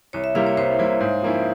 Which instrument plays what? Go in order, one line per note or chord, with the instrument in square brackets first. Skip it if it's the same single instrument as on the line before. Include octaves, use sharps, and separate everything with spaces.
[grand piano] C2 [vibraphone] C#5
[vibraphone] E5
[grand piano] C3 G3 A#3 E4 [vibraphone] F5
[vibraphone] C#5
[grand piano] C2 [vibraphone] C5
[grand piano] C3 G3 A#3 E4
G#2
F3 A#3 C#4 E4